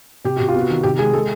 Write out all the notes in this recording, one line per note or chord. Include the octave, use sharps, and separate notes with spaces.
C3 G4
C3 F#4
F4
B3
F#4
D#3
C3 G4
G#3 G#4
G#3 A4